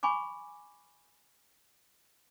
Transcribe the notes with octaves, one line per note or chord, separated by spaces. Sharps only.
G#5 B5 C#6 D6